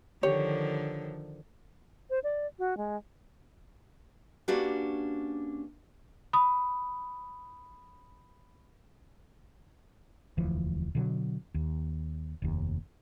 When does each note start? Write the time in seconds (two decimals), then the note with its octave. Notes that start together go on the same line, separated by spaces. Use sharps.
0.23 D3 D#3 F3 G4 C#5
2.10 C5
2.24 D5
2.59 F#4
2.77 G#3
4.48 A#3 C#4 D4 F#4 G4 B4
6.33 B5 D#6
10.37 E1 D2 E3 F3
10.95 B2 D3 F#3
11.54 D#2
12.42 F1 D#2